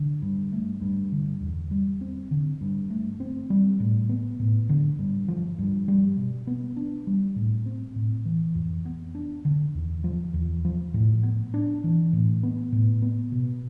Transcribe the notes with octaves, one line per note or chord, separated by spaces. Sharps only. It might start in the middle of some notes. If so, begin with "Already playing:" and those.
Already playing: D3
G2
A3
G2
D3
E2
G3
C4
D3
G2
A3
C4
G3
A2
B3
A2
D3
G2
F3
G2
G3
B2
B3
D4
G3
A2
C4
A2
E3
F2
B3
D4
D3
E2
F3
E2
F3
A2
B3
D4
E3
A2
B3
A2
B3
B2